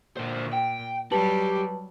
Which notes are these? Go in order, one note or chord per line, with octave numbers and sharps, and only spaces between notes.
A#2 D3 C5
G5
F#3 G3 G4 B4 A5 F#7